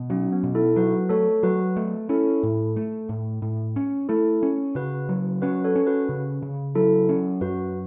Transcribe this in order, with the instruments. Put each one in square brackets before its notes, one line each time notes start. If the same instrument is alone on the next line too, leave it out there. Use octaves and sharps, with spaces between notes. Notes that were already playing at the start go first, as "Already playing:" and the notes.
Already playing: [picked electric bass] B2
[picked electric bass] F#3 [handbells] C#4
[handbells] B3
[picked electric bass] B2
[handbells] E4 A4
[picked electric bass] F#3 [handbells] F#4 B4
[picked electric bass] A3 [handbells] A4 C#5
[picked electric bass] F#3 [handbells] F#4 B4
[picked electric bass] A3
[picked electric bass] C#4 [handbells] E4 A4
[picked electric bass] A2
A3
A2
A2
C#4
[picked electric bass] A3 [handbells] E4 A4
[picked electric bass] C#4
[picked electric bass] C#3 [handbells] F#4 B4
[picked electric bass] F#3
[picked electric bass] C#4 [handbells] F#4 B4
[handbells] A4 C#5
[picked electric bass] C#4
[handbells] F#4 B4
[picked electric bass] C#3
C#3
[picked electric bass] F#3 [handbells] E4 A4
[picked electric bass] C#4
[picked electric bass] F#2 [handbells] F#4 B4